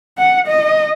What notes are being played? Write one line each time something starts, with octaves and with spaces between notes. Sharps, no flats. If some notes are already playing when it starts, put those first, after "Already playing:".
F#5
D#5